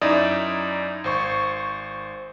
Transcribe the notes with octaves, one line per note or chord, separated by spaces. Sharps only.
F#2 D#4 E4 D5 D#6
G#1 C5 C#6